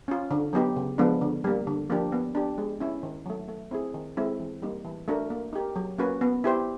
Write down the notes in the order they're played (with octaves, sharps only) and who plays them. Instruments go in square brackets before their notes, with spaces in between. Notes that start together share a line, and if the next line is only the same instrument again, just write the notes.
[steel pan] C#4 F4
D3
F#3 B3 D#4 G4
C#3
F3 G#3 B3 D4
D3
G3 A#3
D3
F3 A#3 D4 G4
B3
D4 G4
G#3
C#4 E4
D#3
F#3 A3
A3
C4 E4 G#4
D#3
G#3 C4 E4 A4
E3
G3 A#3 D#4
E3
A3 D4 F#4 A#4
A#3
D#4 G4 A#4
F#3
A#3 C#4 F#4 B4
B3
E4 G4 C5